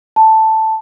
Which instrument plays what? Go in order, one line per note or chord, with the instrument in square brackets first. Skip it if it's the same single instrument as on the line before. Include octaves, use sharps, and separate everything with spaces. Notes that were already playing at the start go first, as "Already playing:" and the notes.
[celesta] A5